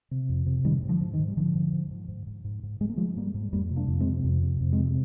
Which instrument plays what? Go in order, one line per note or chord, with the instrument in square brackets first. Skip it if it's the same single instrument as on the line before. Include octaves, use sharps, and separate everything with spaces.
[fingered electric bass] C3
F2
C3
G#2 D#3 G3
G#2
D3 F3
G#2
D#3
G#2
G3
G#2 D3 F3
G#2
G#2
G#2
G#2
G#2
G#2
G#2
G#2 G#3
A#3
G#2 F3 G#3
G#2 G3 A#3
G#2
F2 G3 A#3
C3
A#3 D4
F2
G#3 C4
C3
F2
C3
F2
G#3 C4
C3